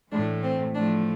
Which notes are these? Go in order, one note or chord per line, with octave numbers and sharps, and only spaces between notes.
A2 E3 A3 D4
C4
A2 F3 A3 D4